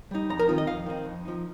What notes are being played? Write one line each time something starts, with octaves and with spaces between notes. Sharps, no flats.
G3 D#4
F2 A#5
A#4
D#3 C4 D#4 F4
D#5
F2 F5
D#3 C4 D#4
F2
F3 D#4